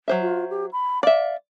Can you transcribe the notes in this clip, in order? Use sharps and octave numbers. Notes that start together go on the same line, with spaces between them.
F#3 C5 E5
F4
G4
B5
D5 E5 F5